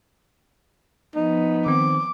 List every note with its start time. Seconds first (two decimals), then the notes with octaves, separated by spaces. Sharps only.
1.15 F3 B3 D#4
1.66 D#3 C4 D6